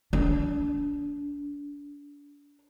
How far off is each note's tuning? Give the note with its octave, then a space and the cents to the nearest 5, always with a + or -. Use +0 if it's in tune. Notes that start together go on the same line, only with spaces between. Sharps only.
D4 -30